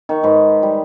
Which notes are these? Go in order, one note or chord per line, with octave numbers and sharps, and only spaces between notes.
D#3 C#6
G#2 D#3 B4 D#5
G3